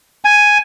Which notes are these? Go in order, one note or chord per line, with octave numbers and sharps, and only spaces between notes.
G#5